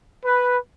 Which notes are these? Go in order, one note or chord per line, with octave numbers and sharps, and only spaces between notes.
B4